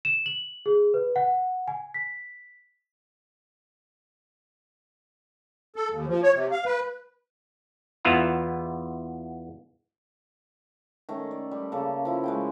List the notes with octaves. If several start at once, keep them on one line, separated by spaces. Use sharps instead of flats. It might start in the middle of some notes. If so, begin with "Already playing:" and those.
E7
F#7
G#4
B4
F#5
G#5
B6
A4
D#2
F3
C#5
C3
F5
B4
E2 B3 E4 F4 E5 A#5
D#3 A3 C#4
D5
G3
C#3 A#3 A4
F3 E4
G#3 A3 G5